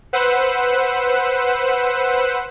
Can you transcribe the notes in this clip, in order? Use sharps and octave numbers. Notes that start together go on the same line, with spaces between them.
B4 C5 F#5 E6